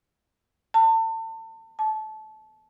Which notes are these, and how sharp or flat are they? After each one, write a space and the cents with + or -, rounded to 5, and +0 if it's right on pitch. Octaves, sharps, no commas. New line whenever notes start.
A5 +35
A5 -25